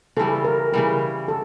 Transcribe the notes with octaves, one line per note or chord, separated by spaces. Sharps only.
C#3 E3 G3 A4
A#4
C#3 E3 G3 A#4
A4